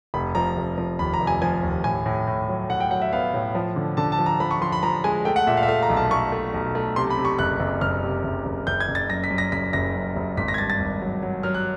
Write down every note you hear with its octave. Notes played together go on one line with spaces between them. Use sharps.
F1 B5
F3 A#5
F1
F3
D#2 B5
A#5
F1
G#5
F3 G#5
D#2
A2 G#5
A2
A2
F#3
A2 F#5
G5
F#3 F#5
E5
B3 F5
A2
F3
D3
D3 A5
A5
F3
A#5
F3 B5
C#6
F3 C6
B5
F3 A#5
G#3 G#5
A3 G5
F#5
A#2 E5
F5
E5
A3 F5
A#5
B1
A5
A3 C#6
A3
B1
A3
C3 C6
B5
C3
C#6
F#1 F#6
F#1
F#1 F6
C3
F#1
F#1
F#1 G6
G#6
F#1
A6
F#2 A#6
B6
F#2
A#6
F#1 B6
F#1 A#6
F#2
F#1
G#1 B6
A#6
G#6
G2 A6
A6
G#1
F#3
F#3
F#3 F6
F#6